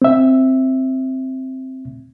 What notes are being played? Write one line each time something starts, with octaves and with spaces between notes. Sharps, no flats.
C4 E5